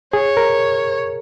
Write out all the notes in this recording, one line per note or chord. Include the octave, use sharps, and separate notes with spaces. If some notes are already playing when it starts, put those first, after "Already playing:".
G#4 C#5
A#4